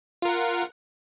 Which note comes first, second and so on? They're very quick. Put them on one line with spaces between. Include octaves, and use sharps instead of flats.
F4 A#4 F#5